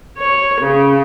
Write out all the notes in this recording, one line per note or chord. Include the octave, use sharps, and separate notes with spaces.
C#5
C#3